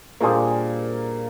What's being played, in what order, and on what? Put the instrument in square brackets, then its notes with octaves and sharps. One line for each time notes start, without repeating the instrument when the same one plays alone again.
[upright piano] A#2 A#3 [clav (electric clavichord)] G3 D4 G#4 C5